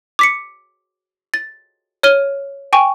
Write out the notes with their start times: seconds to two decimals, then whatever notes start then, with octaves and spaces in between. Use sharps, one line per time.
0.19 D6 B6 C#7
1.34 A6
2.03 C#5 F6 D#7 G7
2.73 G5 G#5 C#6